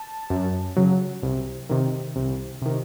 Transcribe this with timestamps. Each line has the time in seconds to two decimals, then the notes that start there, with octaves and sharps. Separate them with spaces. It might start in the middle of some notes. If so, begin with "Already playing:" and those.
Already playing: A5
0.30 F#2
0.77 C#3 F#3
1.23 C2
1.69 C3 D#3
2.16 C2
2.62 C3 D#3